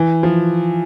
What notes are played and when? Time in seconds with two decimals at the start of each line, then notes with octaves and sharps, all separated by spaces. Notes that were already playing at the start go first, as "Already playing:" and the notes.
Already playing: E3
0.23 F3